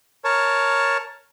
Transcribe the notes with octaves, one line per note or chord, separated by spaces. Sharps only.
A#4 C#5 A5